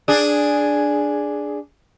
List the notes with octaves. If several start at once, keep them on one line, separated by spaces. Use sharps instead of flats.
D4 G#4